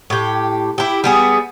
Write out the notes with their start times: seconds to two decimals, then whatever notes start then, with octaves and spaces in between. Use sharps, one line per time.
0.10 A2 G4
0.78 E4 G4
1.04 G3 B3 G#4